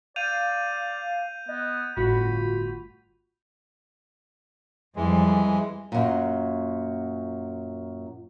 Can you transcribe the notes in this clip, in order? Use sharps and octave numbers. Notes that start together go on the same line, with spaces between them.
D5 F5 G6 D#7 F7
B3 D#5
G1 A2 F4 F#4 B5
F2 E3 G3 G#3
F#2 A#2